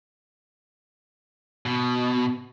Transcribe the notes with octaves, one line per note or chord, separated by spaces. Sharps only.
B2